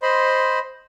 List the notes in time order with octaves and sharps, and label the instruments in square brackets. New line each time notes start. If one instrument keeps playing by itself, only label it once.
[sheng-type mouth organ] C5 D#5 B5 C6